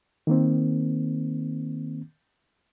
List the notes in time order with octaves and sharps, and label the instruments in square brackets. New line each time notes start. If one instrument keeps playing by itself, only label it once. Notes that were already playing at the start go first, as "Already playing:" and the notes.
[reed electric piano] D#3 A#3 C4